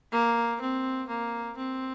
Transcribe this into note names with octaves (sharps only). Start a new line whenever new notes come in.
A#3
C4
A#3
C4